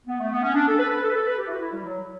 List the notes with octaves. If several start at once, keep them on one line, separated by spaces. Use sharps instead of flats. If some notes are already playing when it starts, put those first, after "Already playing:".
B3
A3
B3
C#4
D4
A4
B4
B4
A4
B4
A4
B4
G4
E4
F#4
E4
G3
F#3